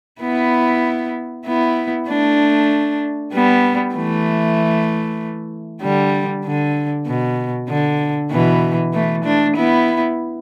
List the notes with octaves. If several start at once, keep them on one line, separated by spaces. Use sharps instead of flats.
B3 E4
B3 E4
A3 D4
G3 B3
E3 A3
D3 G3
D3
B2
D3
B2 E3
E3 A3
A3 D4
B3 E4